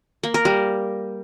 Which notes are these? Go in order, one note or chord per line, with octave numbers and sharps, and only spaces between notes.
A#3
A#4
G3